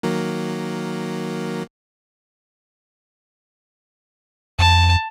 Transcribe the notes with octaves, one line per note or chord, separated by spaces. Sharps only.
D#3 F#3 A#3
F2 A5